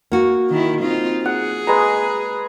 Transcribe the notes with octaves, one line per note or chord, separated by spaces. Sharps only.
A#3 F#4
D#3 E4
C4 D#4 F4
G#4 F#5
G#3 B4 A#5